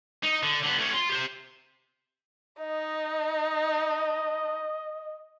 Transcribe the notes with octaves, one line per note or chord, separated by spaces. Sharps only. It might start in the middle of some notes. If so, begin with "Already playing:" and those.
D#4
D3
D3 B3
A3 C#4
F4 C6
G4 C5
D#4 D#5